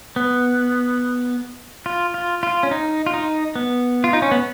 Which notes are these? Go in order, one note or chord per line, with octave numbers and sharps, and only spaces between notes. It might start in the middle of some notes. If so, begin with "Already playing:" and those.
B3
F4
F4
F4
C#4
D#4
F4
D#4
B3
F4
D#4
C#4
B3